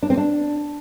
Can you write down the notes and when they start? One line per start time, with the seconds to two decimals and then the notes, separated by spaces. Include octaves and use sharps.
0.03 D4
0.10 C4
0.17 D4